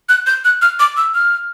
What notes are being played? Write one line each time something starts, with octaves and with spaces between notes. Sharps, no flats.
F#6
G6
F#6
F6
D6
E6
F6